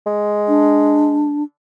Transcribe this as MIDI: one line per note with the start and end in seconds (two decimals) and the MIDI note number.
0.07 1.37 56
0.48 1.43 62